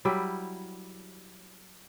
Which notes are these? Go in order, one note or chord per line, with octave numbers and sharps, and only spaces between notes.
F#3 G3 E4 G4